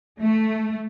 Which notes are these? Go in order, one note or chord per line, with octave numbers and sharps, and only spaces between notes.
A3